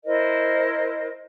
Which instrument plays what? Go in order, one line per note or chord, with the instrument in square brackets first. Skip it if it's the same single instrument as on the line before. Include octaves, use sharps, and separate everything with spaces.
[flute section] E4 A#4 C5 D#5